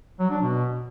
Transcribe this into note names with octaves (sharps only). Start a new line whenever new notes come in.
F#3
D4
B2